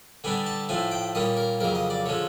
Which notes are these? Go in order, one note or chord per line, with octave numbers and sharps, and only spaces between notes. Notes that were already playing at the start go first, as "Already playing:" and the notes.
D3 G3 B3 D4 G#5
A5
A2 F3 A3 G#5
G5
A#2 G3 A#3 C#4 D#5
A#4
F2 C#3 F#3 A#3 A#4
D#5
D5
D3 F3 G#3 C#4 C#5